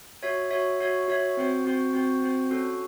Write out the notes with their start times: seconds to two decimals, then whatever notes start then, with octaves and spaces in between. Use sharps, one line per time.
0.23 F#4 C#5 E5
0.51 F#4 C#5 E5
0.80 F#4 C#5 E5
1.08 F#4 C#5 E5
1.37 C4 F#4 C5
1.65 C4 F#4 C5
1.93 C4 F#4 C5
2.22 C4 F#4 C5
2.51 C#4 F#4 A4